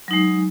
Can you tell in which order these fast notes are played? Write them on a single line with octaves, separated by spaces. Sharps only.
F#3 D#4 G#3